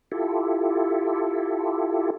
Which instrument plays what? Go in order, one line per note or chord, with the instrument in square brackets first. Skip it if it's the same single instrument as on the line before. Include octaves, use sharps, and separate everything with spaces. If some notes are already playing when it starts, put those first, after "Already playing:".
[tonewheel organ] E4 F4 G4 A4